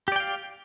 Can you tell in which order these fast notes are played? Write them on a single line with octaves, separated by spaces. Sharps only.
G4 D5 G5 F5